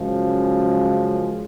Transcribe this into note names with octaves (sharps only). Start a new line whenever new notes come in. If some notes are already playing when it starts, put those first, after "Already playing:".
Already playing: F#2 C#3 F3 G#3